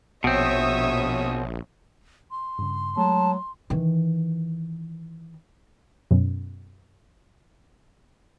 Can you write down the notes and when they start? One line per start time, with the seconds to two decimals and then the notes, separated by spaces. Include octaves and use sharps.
0.24 A#1 B2 C4 C#5 E5 D#6
2.31 C6
2.59 G2 C#3
2.97 F#3 G#3 A3 A5
3.70 D#3 E3
6.11 F#2 B2